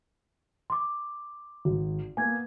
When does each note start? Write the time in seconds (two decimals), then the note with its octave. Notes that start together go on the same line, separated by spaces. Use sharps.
0.70 C6 D6
1.65 G#1
2.17 A#3 B3 G#5 G#6